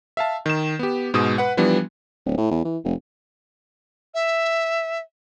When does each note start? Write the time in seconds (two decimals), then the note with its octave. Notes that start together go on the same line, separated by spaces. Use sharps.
0.17 E5 F5 A5
0.46 D#3 E7
0.79 B3 G4
1.14 G#2 B2 G#3 D#6
1.38 B4 F#5
1.57 E3 F3 G3 B3 D4
2.26 D1
2.38 A2
2.51 E2
2.65 E3
2.84 F1
4.14 E5